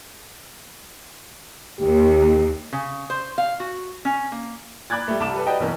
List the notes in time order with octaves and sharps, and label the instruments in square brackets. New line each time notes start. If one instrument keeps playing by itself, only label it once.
[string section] D#2 [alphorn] G4
[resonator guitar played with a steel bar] C#3
C5
F5
F#4
C#4
A#3
[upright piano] B5 D6 F#6 G#6 A6
G3 A3
C2 A5 B5 D6 E7
G3 A4 B4
F#4 B4 D5 D#5 G5
B1 E2 C#4 A#4